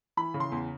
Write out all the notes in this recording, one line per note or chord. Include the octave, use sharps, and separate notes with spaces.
E3 B5
C#3
C6
E2